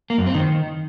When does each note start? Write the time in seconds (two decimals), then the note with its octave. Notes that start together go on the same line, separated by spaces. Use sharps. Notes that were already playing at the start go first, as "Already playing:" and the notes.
0.10 A#3
0.18 F#2
0.26 C4
0.35 D#3